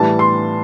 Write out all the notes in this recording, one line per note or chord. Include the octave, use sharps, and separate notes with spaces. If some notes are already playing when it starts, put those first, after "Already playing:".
Already playing: A2 E3 G3 A5
C6